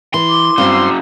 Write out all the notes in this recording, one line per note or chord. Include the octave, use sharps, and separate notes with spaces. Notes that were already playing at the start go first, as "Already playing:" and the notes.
E3 C6
D6
G2 C#3 F#3 C4 F5